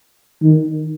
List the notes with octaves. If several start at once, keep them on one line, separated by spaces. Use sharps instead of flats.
D#3